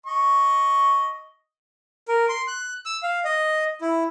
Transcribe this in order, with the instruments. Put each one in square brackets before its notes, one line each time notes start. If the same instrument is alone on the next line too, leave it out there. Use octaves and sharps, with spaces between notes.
[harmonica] D#5 C#6
[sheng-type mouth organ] A#4
C6
F#6
E6
F5
D#5
E4